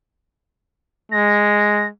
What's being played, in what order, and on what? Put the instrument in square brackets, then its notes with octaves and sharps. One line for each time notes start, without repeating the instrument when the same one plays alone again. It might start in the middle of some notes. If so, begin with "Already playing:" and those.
[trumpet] G#3 [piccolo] A#6